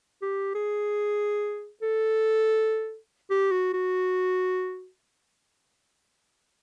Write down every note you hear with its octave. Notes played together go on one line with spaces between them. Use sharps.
G4
G#4
A4
G4
F#4
F#4